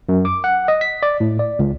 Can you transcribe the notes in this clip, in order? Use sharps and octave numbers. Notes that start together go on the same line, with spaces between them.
F#2
D6
F#5
D#5
B6
D5
A2
D5
C#2